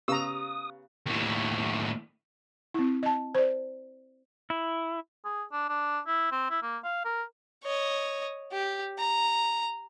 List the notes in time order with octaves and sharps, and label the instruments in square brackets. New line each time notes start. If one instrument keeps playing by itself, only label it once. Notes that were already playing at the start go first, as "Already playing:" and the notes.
[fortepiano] C#3 B3 F5 [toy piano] G4 [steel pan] A#5 E6 [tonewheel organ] D#6
[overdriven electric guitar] D#2 A2
[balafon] C4 E4
D#5 A5
C5 D5
[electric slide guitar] E4
[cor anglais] G#4
D4
D4
E4
C4
E4
A#3
F5
A#4
[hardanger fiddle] C#5 D#5
G4
A#5